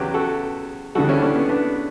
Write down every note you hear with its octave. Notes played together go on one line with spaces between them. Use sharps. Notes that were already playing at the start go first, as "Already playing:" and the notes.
Already playing: E2 C#3 F#3 G4 B4
F#4 A4
D2 C#3 E3 G3 F#4 A4
C#4 E4
D4
A3 C#4
B3
B3 D4